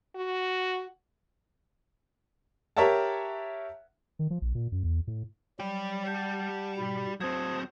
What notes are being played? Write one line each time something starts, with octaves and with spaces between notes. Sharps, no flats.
F#4
G4 A#4 C#5 E5 F#5 A5
D#3
F3
A#1
A#2
F#2
E2
A2
F#3 G3 G4 B5
F#5 A5 G6
G#2 B2 B5
F#3 C4 C5 A5 D#6 G#6